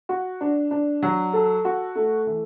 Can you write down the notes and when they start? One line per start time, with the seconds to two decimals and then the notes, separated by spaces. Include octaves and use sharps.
0.09 F#4
0.41 D4
0.71 D4
1.02 F#3
1.33 A4
1.65 F#4
1.96 A3
2.26 E3